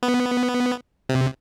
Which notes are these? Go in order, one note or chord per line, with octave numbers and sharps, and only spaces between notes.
B3
C3